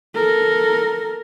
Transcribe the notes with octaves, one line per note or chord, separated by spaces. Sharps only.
A4 A#4